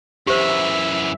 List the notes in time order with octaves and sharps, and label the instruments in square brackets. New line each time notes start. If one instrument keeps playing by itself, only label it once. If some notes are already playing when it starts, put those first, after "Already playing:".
[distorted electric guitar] F#2 E3 [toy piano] G4 C5 [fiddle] E5